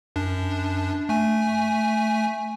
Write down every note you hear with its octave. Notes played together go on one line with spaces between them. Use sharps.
F#2 D4
A3 G#5